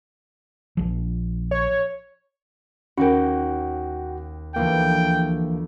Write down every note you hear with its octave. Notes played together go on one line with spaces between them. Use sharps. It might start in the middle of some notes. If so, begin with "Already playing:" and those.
A#1 F3
C#5
D#2 C#4 F#4 A#4 F#5 G5
D2 E3 F3 A#3 B3 G5